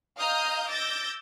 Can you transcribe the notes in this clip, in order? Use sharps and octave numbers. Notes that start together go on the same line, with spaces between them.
D#5 F5 A#5 D#6 F6 G6
D6 E6 G6 A6 A#6